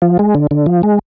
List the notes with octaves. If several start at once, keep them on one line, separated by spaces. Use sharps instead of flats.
F3
G#3
D3
D3
F3
G#3